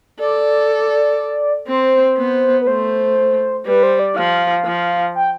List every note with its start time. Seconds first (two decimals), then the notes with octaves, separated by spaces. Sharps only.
0.19 A4 D5
1.68 C4 C5
2.17 B3
2.62 B4
2.67 A3 C5
3.66 G3 B4
3.83 C5
3.99 D5
4.16 F3 F5
4.65 F3
5.15 G5